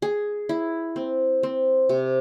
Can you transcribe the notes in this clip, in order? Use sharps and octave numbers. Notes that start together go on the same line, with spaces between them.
G#4
E4
C4
C4
C3